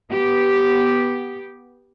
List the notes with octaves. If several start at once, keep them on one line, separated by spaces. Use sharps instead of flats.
B3 G4